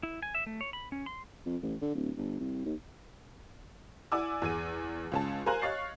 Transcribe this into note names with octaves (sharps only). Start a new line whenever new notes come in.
E4
G#5
E5
A3
C#5
B5
C#4
C6
F2
A1
D3
D1
G1
C2
D#2
E4 D5 F#5 G#5 D6 E6
E2 G#4 D#7
C#2 C#4 A5
A#4 C5 F5 G#5 A#5 F#6
C#5 D#5 F5 C#6 A6 C7